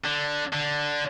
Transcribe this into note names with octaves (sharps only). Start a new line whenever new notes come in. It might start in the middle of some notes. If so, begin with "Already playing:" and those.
D3
D3